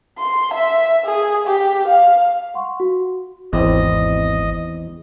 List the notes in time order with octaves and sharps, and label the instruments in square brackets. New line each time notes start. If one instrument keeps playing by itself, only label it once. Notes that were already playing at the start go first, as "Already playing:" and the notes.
[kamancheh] C6
E5
G#4
G4
F5
[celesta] F#5 C6 C#6
F#4
[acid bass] G#1 [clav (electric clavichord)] E2 C4 [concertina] D#5